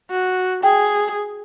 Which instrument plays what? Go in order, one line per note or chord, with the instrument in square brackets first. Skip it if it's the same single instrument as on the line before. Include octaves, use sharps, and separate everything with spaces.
[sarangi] F#4
[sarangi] G#4 [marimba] G5